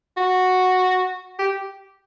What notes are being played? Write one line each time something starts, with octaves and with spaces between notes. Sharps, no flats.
F#4
G4